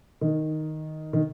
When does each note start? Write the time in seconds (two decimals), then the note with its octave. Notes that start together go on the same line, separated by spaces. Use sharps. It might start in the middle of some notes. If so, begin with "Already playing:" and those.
0.21 D#3
1.13 D#3